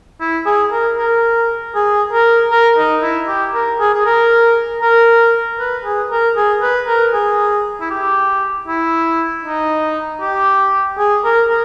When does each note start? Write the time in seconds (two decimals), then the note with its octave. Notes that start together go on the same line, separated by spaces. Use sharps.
0.21 E4
0.46 G#4
0.72 A#4
0.97 A#4
1.75 G#4
2.13 A#4
2.51 A#4
2.77 D#4
3.02 E4
3.28 G4
3.54 A#4
3.80 G#4
3.94 G#4
4.05 A#4
4.82 A#4
5.59 B4
5.85 G#4
6.11 A#4
6.36 G#4
6.62 B4
6.87 A#4
7.13 G#4
7.81 E4
7.90 G4
8.68 E4
9.44 D#4
10.21 G4
10.98 G#4
11.24 A#4
11.49 A#4